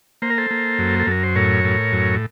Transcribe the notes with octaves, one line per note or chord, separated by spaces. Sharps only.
A#3 C5
A#4
A4 C5
A#3
F#2
A4
F#2 A#4
C5
A2 A#4 C#5
A2
F#2